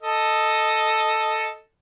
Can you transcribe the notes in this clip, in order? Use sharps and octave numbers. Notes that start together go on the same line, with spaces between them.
A4 D#5